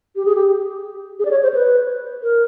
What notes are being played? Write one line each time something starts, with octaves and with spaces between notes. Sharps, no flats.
G4
G#4
G4
G#4
D5
C#5
C5
B4
A#4